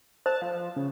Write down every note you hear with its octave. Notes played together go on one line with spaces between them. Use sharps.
C5 A5
F3
C#3